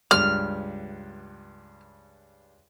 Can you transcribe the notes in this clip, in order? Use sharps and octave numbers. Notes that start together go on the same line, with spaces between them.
C#2 G2 G3 F6